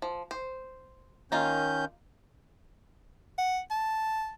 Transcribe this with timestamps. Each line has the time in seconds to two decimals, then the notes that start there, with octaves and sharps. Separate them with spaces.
0.02 F3
0.31 C5
1.32 D#3 A#3 C#4 D#4 F4 G6
3.38 F#5
3.71 A5